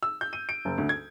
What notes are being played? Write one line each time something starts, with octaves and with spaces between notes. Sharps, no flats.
E6
G6
D#7
D7
F#1
D2
G#6